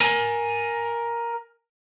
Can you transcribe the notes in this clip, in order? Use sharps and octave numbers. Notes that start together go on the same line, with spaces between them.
A#4 G#5